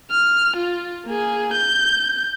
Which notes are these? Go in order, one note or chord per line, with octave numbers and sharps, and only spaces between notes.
F6
F4
A#3 G#4
G6